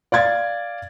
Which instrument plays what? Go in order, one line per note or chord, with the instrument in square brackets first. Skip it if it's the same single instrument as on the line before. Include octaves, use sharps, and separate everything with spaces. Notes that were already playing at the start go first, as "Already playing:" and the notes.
[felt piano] D5 F5 G#6 A6